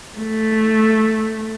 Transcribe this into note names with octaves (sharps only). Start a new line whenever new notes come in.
A3